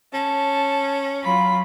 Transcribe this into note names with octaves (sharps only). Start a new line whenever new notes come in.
C#4 A5
F#3 F4 B5